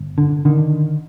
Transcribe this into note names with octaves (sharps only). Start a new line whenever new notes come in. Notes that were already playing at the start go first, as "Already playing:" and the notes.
Already playing: G1
D3
D3 D#3